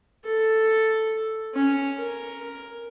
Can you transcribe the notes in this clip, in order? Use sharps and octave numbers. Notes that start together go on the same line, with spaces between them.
A4
C#4
A#4